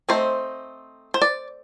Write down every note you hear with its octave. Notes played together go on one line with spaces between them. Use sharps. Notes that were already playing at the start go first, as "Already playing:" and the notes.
A3 C4 D#4 C5
C5
D5